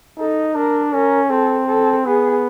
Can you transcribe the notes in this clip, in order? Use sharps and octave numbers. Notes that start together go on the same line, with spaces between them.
D#4 A4
D4 A#4
C#4 A#4
C4 A4
A4
B3 G#4